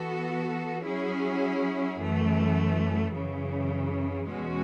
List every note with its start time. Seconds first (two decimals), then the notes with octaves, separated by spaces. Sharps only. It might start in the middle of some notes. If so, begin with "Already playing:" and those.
Already playing: E3 B3 F#4 A4
0.83 F#3 C#4 E4 G#4
1.98 F#2 E3 A3
3.13 F#2 C#3 E3
4.29 E2 B2 G#3 C#4 F#4